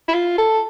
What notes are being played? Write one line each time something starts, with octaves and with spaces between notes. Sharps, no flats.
E4
F4
A4